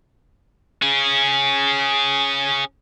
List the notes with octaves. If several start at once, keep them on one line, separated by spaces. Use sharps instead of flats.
C#4 G#4